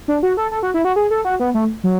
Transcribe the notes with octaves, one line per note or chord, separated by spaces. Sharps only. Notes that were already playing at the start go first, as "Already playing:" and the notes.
D4
F#4
A4
A4
F#4
E4
F#4
G#4
A4
F#4
B3
A3
F#3